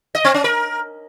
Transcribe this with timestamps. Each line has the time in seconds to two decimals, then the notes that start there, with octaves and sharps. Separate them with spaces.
0.15 D#5
0.24 C4
0.34 C#4
0.44 A#4